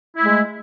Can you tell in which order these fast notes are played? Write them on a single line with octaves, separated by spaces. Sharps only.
E4 A3 G#3